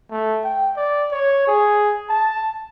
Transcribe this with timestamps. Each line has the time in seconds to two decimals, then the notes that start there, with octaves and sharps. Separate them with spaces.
0.11 A3
0.44 G5
0.77 D5
1.11 C#5
1.47 G#4
2.09 A5